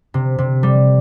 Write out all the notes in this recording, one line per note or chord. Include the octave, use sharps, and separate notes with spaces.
C3
C3
G3